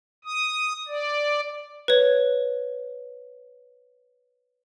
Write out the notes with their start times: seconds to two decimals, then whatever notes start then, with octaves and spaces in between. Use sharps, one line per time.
0.25 D#6
0.88 D5
1.88 B4 C#5